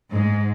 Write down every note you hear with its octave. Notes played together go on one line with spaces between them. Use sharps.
G#2